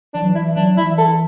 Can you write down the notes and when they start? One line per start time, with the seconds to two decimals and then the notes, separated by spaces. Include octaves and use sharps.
0.14 E3 D4
0.22 F#3
0.31 E3 E4
0.56 F#3 D4
0.77 E3 E4
0.98 A4